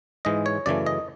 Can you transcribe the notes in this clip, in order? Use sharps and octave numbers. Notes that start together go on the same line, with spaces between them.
G#2 E3 G#3 D#5
C#5
F#2 C#3 E3 A3 D5
D#5